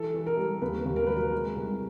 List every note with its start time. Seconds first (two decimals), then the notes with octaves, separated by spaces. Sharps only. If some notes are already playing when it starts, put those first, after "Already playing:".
Already playing: E3 A4
0.14 E3
0.27 A#4
0.37 G3
0.62 D#2 B4
0.85 D#2
0.96 A#4
1.07 F#3 B4
1.16 A#4
1.32 G#3
1.56 C2